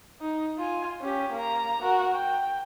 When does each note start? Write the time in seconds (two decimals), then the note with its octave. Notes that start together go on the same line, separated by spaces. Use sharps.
0.21 D#4
0.57 F4 G#5
1.01 C#4 G4
1.33 A#3 A#5
1.82 F#4 A#4
2.14 G5